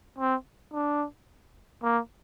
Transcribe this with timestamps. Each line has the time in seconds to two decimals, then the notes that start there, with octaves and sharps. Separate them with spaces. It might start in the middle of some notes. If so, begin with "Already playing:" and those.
0.19 C4
0.73 D4
1.83 A#3